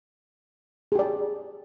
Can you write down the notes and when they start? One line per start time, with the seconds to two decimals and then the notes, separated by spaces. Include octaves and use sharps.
0.92 G#4
0.95 G4
0.99 D5